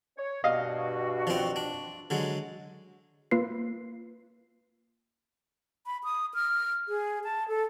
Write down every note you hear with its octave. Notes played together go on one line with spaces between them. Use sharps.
C#5
G2 B2 F#4 D#5 F5
F3 C4
D4
D3 F#3 G#3
A#3 F4 B4 C7
B5
D#6
F6
G#4
A5
A4